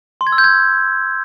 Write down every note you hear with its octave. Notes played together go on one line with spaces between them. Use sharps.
C6
G#6
E6
G6
G#6